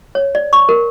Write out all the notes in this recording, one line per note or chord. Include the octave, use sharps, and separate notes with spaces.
C#5
D5
C#6
A#4